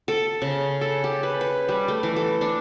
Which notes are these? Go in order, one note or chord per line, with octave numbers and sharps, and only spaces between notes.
A4
C#3
A4
G4
B4
B4
G3
A3
E3
A4
D4